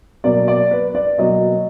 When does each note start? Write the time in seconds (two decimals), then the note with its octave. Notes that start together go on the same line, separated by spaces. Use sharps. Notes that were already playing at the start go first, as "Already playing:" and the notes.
0.24 B2 F#3 A#3 D5
0.48 D5
0.71 B4
0.95 D5
1.18 B2 F#3 A#3 D#5